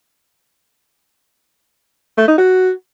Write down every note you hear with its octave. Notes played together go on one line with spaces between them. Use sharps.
A3
D#4
F#4